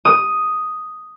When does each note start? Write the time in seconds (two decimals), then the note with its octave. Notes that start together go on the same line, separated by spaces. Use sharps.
0.05 D#6